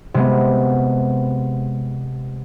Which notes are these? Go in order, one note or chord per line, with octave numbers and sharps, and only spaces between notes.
C3 G#3 B3